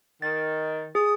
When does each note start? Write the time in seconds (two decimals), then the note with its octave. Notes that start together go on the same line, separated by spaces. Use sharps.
0.22 D#3 A6
0.95 G#4 D#6